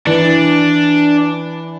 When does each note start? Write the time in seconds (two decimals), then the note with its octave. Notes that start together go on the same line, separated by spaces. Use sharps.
0.07 E3 D4